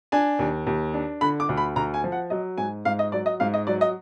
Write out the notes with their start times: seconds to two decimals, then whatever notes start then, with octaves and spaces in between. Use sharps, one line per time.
0.12 D4 G#5
0.39 D#2
0.67 D#2
0.94 D4
1.21 D3 B5
1.40 D6
1.49 D2
1.57 B5
1.76 D2 A#5
1.94 G#5
2.04 F3
2.12 F#5
2.30 F#3 D#5
2.58 G#2 G#5
2.85 G#2 F5
2.99 D#5
3.12 F#3 D5
3.26 D#5
3.40 G#2 F5
3.54 D#5
3.67 F#3 D5
3.81 D#5